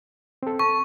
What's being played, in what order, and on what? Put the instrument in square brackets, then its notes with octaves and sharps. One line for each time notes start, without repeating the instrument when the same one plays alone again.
[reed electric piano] C4 A4
[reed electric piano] A5 [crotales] C#6